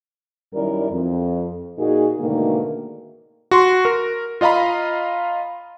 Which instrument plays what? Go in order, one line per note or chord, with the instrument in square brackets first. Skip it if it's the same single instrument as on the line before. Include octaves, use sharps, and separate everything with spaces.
[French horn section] F#2 D#3 G3 E4 A#4 D5
F2
A#2 A#3 D#4 F#4 G#4
G#2 B2 D3 D#3 A3 A#3
[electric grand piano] F#4 C6
A#4
F4 D#5 F5 A#5 B5